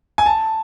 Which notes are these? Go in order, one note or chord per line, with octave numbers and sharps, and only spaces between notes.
G#5
A5